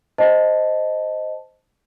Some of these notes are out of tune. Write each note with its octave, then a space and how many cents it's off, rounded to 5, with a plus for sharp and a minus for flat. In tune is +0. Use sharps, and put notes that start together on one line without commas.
C5 -10 D#5 +0 A5 +0